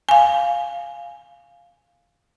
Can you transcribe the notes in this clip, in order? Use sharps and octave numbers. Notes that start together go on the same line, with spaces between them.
F5 G#5